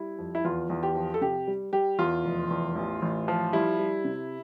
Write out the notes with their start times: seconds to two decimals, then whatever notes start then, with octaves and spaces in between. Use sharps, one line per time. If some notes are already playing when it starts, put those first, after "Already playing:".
Already playing: G3 E4
0.19 F2
0.35 E4
0.44 E2 F4
0.70 E2
0.83 G4
0.95 F3
1.14 A4
1.21 C3 G4
1.48 G3
1.72 G3 G4
1.99 E2 F4
2.25 F1
2.50 E2
2.75 A1
3.02 A1
3.28 F3
3.53 G3 E4
3.79 G3
4.05 C3